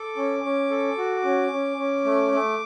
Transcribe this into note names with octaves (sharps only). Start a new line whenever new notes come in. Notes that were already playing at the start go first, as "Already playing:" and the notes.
Already playing: A4 D6
C#4
C#4
A4
F#4
C#4
C#4
C#4
A3
A3